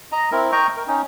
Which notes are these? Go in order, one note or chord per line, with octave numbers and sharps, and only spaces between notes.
D#5 A#5
C4 E4 A#4
D#5 G5 A#5 C#6
A#4
C#4 D#4